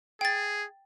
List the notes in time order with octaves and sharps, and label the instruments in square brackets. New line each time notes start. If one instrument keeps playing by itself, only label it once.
[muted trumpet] G#4 [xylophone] G5 A6